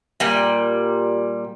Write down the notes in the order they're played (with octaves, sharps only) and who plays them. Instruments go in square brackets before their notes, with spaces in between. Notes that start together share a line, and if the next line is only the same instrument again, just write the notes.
[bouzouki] A#2 G3